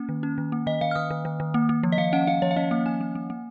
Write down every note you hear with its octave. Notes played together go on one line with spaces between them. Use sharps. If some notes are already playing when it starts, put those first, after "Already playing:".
Already playing: A#3 C#4
D#3
C#4
D#3
A#3
D#3 D#5
D#3 F5
F6
D#3 D#6
D#3
D#3
D#3
A#3
A#3
F3
D#5
F3 F5
C#4 F#5
C#4 F5
F3 C#5
F5
C#4 D#5
A#3 F5
C#4 G#5
A#3
A#3
A#3